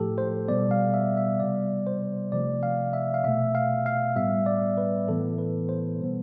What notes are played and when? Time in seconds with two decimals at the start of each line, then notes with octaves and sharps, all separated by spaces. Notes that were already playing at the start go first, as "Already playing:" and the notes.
Already playing: A2 F3 A3 G4 A4
0.18 C5
0.48 B2 G3 B3 D5
0.71 F5
0.94 E5
1.17 E5
1.40 C3 G3 B3 D5
1.87 C5
2.32 C3 F3 A3 D5
2.63 F5
2.93 E5
3.14 F5
3.24 B2 A3 E5
3.55 F5
3.86 F5
4.16 A2 G3 B3 E5
4.46 D5
4.78 B4
5.08 A2 E3 B3 A4
5.38 B4
5.69 C5
5.99 B2 G3 B3